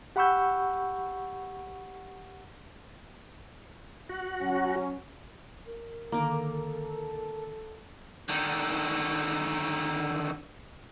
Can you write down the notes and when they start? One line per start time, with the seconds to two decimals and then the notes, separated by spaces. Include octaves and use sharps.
0.16 G4 F#5 B5 C#6 E6 G6
4.09 F#4
4.41 F#3 C#4
5.66 A#4
6.12 D3 D#3 A#3 A4 D6
8.29 D3 D#3